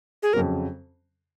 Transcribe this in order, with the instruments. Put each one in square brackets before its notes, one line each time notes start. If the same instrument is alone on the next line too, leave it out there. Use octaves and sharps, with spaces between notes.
[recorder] G#4
[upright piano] F2 C#3 F#3 [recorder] A#4